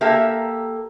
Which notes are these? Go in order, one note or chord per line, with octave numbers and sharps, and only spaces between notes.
A#3 G4 A4 A#4 E5